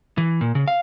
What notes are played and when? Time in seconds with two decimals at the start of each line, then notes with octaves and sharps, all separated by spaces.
0.18 E3
0.41 A#2
0.55 C#3
0.68 F5